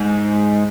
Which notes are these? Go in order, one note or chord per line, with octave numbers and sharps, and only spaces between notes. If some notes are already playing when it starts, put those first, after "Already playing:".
Already playing: G#2